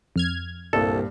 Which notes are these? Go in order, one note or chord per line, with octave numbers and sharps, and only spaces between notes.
F2 F6 G#6
C2 G2 A#2 A4